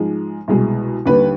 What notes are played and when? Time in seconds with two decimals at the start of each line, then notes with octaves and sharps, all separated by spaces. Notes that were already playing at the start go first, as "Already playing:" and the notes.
Already playing: G#2 F3 G#3
0.48 C2 B2 G#3
1.06 D#2 D3 G3 B4